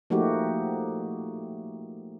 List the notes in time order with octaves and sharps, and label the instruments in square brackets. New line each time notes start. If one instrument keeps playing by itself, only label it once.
[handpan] F3 A3 A#3 D#4 F#4 G4